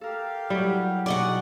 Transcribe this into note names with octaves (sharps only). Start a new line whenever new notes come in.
G4 A4 A#4 F5
F#3 G3 E4
B2 G#3 D#4 F#4 D5 D#5 F#5